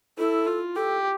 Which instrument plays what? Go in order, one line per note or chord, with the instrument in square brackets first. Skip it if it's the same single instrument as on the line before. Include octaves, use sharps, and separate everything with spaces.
[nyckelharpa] E4 [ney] A4
[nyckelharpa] F4
[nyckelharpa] G4 [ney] A4